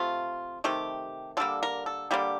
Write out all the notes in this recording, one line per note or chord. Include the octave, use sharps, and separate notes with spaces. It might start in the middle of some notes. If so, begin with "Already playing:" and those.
Already playing: C3 A3 F4
C3 D#3 A3 G4
D3 G3 A#3 A4
A#4
A4
D3 G3 A#3 G4